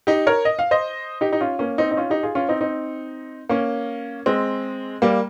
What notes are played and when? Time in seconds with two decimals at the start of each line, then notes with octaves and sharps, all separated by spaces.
0.07 D#4 G4
0.27 A#4 C#5
0.45 D#5
0.59 F5
0.71 C5 D#5
1.21 D#4 G4
1.33 D#4
1.41 C#4 F4
1.59 A#3 C#4
1.78 C4 D#4
1.91 D#4
1.97 C#4 F4
2.10 D#4 G4
2.23 F4 G#4
2.35 C#4 F4
2.49 C4 D#4
2.61 C4 D#4
3.49 A#3 C#4
4.26 G#3 C4
5.02 G3 A#3